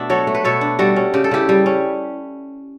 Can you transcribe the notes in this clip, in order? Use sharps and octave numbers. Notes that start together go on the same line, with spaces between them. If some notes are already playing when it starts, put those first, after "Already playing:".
Already playing: B2 A3 D4 E5 F#5
F#3 A4 C#5
A3
B4
B2 A4 C#5
D4
G3 F#4 A4
C#4
C#3 G4
A4
C#3 E4 G4
G3
C#4